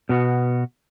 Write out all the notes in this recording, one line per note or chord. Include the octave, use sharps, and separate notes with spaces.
B2 B3 F#4